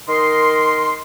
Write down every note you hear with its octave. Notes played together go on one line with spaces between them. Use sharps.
D#3 A#4 D#5 C6